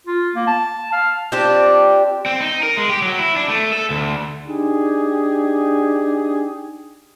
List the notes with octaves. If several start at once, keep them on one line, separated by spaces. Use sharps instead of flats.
F4
A#3
A5
F5
C4 D4 F4 G4
C4
D#4
A#4
G#3
G4
F#3
E4
D4
A3
A4
D2
D4 D#4 G4 G#4